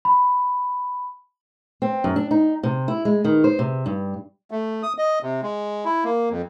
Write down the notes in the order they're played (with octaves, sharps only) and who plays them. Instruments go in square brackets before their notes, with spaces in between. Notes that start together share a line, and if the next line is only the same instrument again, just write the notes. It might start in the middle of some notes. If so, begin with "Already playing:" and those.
[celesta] B5
[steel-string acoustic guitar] C4
F#2
D4
D#4
C3
E4
G#3
D#3
C5
C3
G2
[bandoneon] A3
D#6
D#5
C3
G#3
E4
A#3
F2